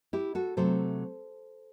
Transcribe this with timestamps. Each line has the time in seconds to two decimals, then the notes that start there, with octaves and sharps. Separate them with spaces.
0.13 E4 G4
0.35 F#4 A4
0.57 C3 F#3 A3 A4 C5